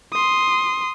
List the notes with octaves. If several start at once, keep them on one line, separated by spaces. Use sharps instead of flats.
C6 D#6